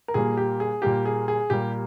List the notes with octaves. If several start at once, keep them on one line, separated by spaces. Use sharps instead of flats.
A#4
A#2 G3 A#3 G#4
G4
G#4
A#2 G3 A#3 G4
G#4
G#4
A#2 G3 A#3 G4